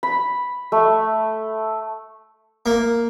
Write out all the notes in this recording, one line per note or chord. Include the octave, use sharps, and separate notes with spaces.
B5
A3
A#3